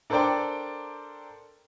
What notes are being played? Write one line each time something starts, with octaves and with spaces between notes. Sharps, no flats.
D4 A4 A#4 C5 D5 G5